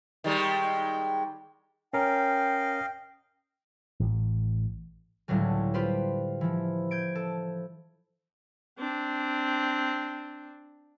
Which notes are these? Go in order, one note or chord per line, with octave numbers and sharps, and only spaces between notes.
D#3 G3 G#3
C#4 A#4 D#5 F5 G5
A1
C#2 A2 D3 F#3 G3
F4 G4 B4 C5
E3 F3
G6 G#6 D7
A4
C4 D4